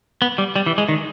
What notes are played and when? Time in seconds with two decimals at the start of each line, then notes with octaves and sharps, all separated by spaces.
0.22 B3
0.38 G3
0.56 G3
0.66 E3
0.78 G#3
0.89 D#3